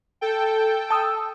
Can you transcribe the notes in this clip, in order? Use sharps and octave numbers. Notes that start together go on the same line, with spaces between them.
A4 G5
A5 D#6 E6